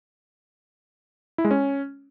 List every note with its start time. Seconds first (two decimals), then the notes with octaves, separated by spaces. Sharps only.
1.38 E4
1.45 G#3
1.51 C#4